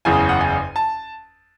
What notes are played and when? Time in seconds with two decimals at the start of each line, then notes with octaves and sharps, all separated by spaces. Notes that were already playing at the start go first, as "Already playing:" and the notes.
0.05 F#1 E2 C#3 G#5
0.29 F#5
0.41 G#5
0.76 A5